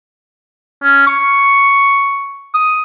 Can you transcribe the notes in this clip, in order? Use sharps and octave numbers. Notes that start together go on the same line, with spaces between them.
C#4
C#6
D#6